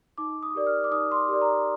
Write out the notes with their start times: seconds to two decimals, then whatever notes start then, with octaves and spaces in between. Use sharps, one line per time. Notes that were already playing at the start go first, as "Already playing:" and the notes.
0.18 D#4 D6
0.43 D#6
0.55 G4 A#4 D5
0.67 F6
0.84 D6
0.91 D#4 D#6
1.11 C6
1.16 D6
1.28 G4 A#4 D5
1.41 A#5